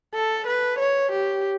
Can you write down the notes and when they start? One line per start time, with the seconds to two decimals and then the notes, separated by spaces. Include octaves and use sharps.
0.15 A4
0.47 B4
0.79 C#5
1.12 G4